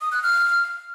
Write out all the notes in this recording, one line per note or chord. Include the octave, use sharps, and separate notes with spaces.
D#6
F#6
F6